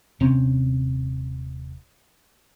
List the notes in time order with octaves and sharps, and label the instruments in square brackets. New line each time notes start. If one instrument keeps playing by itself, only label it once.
[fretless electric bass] D#1 C3 C4 C#4